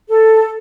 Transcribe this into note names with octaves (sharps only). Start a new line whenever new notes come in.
A4